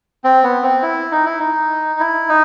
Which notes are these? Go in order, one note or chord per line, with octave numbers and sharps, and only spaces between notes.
C4
B3
C4
E4
D#4
E4
D#4
E4
D#4